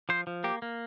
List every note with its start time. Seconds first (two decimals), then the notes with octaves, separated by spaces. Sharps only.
0.09 F3 C5
0.27 F3
0.44 A#3 G4
0.62 A#3